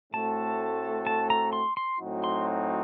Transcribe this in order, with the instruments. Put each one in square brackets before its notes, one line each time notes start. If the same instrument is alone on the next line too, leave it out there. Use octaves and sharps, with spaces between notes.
[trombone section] A2 A3 C4 F#4 A4 [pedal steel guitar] A5
[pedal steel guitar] A5
A#5
C6
C6
[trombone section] A2 F#3 C4 D#4 F#4
[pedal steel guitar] C6